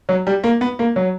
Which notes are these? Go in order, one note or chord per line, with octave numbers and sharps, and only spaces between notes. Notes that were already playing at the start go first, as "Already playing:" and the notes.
F#3
G3
A#3
B3
A#3
F#3